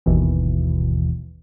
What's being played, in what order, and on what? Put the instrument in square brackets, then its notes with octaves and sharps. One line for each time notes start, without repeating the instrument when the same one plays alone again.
[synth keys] G1 D#2 B2 E3